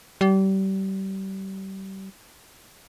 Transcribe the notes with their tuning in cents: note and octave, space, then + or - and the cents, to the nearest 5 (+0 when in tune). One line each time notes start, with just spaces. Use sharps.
G3 -30